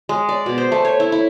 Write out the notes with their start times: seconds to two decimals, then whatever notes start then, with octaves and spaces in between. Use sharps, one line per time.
0.09 G#3
0.29 D5
0.46 B2
0.58 C5
0.72 A3
0.85 C#5
1.00 E4
1.12 E4